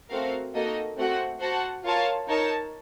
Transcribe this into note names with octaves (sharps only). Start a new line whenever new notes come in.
A3 C4 F#4 A#4 F5
A#3 D#4 F#4 A4 D#5
A3 C4 F#4 C5 F#5
F#4 C5 F#5 A5
F4 A#4 C#5 F5 A5
D#4 A#4 C#5 A5